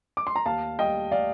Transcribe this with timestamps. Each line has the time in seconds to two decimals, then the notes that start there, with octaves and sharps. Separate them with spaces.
0.17 D6
0.27 C6
0.36 A#5
0.46 D#2 F5 A5
0.79 G3 D#5 G5
1.11 D5 F5